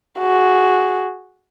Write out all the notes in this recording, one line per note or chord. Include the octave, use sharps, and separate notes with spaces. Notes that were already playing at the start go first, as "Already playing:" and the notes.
F#4 G#4